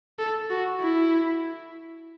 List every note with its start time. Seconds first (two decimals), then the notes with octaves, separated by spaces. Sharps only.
0.19 A4
0.50 F#4
0.81 E4